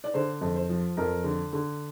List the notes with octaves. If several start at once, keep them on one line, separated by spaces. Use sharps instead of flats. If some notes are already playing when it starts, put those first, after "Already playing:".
D5
D3 C5
F2
C5
F3
F2 A#4
D3
D3